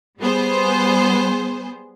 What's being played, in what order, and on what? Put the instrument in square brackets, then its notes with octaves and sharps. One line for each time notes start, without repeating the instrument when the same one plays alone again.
[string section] G3 B3 G#4 C5